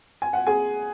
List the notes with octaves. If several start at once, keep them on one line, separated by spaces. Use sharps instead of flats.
G#5
F#5
G#4 G#5